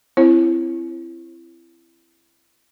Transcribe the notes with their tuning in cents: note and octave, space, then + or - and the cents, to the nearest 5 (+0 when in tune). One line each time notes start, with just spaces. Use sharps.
C4 +0 E4 +25 C#5 -45